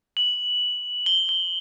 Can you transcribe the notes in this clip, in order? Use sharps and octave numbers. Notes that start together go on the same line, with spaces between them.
F#7
G7
G7